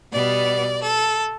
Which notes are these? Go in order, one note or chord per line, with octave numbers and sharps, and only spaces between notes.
B2 G3 B3 D5
A4